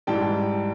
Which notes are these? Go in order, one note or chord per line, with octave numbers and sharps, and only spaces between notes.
G#2 E3 G3 G5 A5